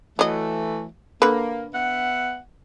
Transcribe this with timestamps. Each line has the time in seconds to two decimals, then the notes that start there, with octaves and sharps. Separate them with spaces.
0.19 E3 F#3 A3 D#5
1.22 D3 A#3 B4
1.74 B3 E5 F#5